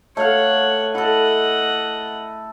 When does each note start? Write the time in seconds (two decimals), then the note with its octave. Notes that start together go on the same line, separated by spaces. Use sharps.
0.17 A3 C#5 F5 F#5
0.95 E4 A4 D#5 F#5